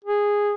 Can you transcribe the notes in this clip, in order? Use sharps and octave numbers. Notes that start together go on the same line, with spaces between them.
G#4